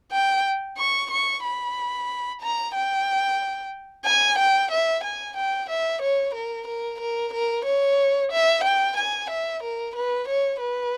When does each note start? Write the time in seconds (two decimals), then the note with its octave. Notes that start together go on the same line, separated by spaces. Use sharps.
0.12 G5
0.78 C#6
1.11 C#6
1.44 B5
2.41 A#5
2.75 G5
4.06 G#5
4.38 G5
4.71 E5
5.04 G#5
5.37 G5
5.69 E5
6.02 C#5
6.34 A#4
6.68 A#4
7.00 A#4
7.33 A#4
7.65 C#5
8.32 E5
8.64 G5
8.97 G#5
9.30 E5
9.63 A#4
9.95 B4
10.28 C#5
10.60 B4